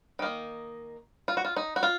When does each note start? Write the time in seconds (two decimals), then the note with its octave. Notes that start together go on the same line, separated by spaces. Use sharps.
0.19 D#3 A#3 D#4
1.28 F4
1.37 F#4
1.45 F4
1.56 D#4
1.76 F#4
1.83 F4